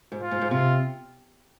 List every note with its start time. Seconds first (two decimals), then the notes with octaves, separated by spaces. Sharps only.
0.12 G#2
0.22 F4
0.31 G#2
0.41 G#2
0.50 C3 F4